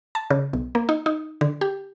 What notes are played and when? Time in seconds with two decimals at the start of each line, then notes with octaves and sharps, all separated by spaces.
0.15 A5
0.30 C#3
0.53 B1
0.75 A#3
0.89 D#4
1.06 D#4
1.41 D3
1.61 G4